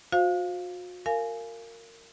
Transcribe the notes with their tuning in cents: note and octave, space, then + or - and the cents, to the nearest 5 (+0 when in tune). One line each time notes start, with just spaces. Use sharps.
F#4 -40 C5 +0 F5 +0
A#4 -20 F5 -20 G#5 +15